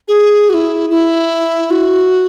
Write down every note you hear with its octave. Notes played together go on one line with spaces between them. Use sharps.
G#4
F#4
E4
E4
F#4